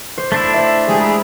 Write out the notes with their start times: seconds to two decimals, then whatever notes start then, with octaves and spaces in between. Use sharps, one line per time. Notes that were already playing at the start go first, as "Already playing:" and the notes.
0.18 C5
0.32 A3 D4 E4
0.52 C5 E5 A6
0.88 G#3 G4 G#4
1.00 G#4 A#5 B5